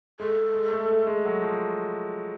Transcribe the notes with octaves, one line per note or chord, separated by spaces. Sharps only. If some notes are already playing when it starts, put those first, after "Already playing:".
G#3 A4
G#3
A3
A3
G#3
F#3
F3